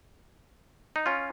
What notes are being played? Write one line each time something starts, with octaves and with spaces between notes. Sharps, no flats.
D#4
C#4 F4